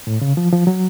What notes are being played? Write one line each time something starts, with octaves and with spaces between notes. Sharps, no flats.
A2
C#3
F3
F3
F#3